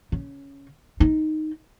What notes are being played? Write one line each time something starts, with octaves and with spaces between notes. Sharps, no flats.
C#3
D#4